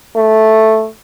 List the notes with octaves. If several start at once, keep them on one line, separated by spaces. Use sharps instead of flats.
A3